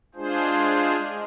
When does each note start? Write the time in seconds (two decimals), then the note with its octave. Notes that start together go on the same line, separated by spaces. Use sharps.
0.14 G#3 D4 F4 G#4 C5
0.96 G#3